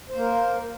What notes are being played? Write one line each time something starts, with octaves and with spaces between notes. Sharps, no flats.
A#3 A#4 C5